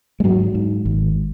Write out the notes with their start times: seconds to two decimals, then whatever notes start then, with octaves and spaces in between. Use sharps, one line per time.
0.20 G#3
0.24 G#2 F#3
0.55 G#2
0.85 G#1